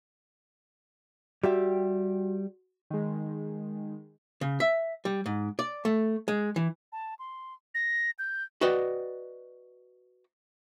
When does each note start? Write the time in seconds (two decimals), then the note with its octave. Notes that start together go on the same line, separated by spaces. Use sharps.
1.44 G3 F#4 G4 E5
2.90 D#3 G#3
4.41 C#3
4.60 E5
5.05 G3
5.26 G#2
5.59 D5
5.85 A3
6.28 G#3
6.56 E3
6.92 A5
7.19 C6
7.74 A#6
8.19 G6
8.61 F#4 B4 D5 D#5 G5